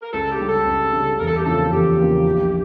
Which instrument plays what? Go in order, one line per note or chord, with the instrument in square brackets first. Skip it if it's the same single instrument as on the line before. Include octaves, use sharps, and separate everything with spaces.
[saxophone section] A#4
[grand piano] C#2 [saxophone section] A4
[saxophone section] G4
[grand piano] C#3 G3
[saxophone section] A4
[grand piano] C#2
C#3 G3
[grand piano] E2 [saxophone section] A#4
[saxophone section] A4
G4
[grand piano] C#3 F3 A#3 [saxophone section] A4
[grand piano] E2 [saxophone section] G4
[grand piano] C#3 F3 A#3
A#1